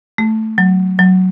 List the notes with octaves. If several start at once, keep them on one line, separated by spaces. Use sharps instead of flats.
A3
F#3
F#3